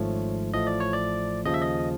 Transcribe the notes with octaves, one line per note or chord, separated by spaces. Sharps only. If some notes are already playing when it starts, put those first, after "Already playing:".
Already playing: G#1 G#2 F3 A3 C#5
A1 A2 F3 A3 D#5
D5
C#5
D5
D#2 C#3 F3 D#5
E5
D#5